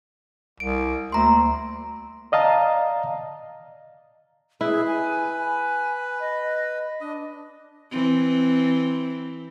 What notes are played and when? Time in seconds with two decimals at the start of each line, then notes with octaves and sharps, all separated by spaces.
0.60 C2 D7
1.12 D2 A#3 A#5 C6
2.32 D5 D#5 F5 A5 A#5
4.61 E4 G#4 B4
4.87 G#5
5.38 G#5
6.20 D#5
7.01 D4 D#5
7.91 E3 C4